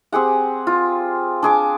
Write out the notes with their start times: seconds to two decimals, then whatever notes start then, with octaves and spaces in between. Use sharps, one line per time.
0.12 C4 G4 G#4 F#5
0.67 F4
1.43 D4 G#4 D6